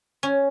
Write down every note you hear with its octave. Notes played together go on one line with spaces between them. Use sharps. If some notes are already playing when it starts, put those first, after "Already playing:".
C#4